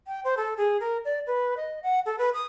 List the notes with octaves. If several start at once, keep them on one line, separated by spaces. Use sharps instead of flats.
G5
C5
A4
G#4
A#4
D5
B4
D#5
F#5
A4
B4
D#6